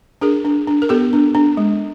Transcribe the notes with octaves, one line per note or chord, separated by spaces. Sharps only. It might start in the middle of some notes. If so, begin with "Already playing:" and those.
D4 G#4 A#4
D4
D4
A#4
B3 G4 A4
D4
D4
G#3